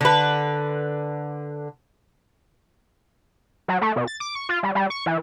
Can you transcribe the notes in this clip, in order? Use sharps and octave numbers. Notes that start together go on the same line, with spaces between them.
D3 B4
F#3
A3
B2
A6
D6
C#6
F4
G3
G3
C#6
E3